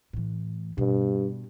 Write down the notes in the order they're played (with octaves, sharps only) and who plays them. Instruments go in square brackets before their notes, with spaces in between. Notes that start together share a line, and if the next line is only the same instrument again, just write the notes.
[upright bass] A2 E3
[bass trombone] G2 [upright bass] B2